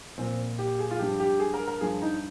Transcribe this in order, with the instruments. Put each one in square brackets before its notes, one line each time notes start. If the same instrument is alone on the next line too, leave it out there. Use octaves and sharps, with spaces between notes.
[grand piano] A#2 F3 C4
G4
G#4
F4
G2 F3 G4
G4
G#4
A#4
A#4
G2 F3 G#4
D#4